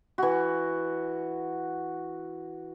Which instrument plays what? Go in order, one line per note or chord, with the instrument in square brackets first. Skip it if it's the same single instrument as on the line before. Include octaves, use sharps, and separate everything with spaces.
[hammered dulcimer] E3 F#4